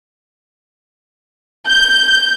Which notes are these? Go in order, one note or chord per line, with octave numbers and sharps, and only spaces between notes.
G6